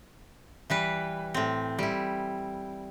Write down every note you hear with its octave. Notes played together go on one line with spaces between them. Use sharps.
E3 G3 B4
A2 C4
G3 E4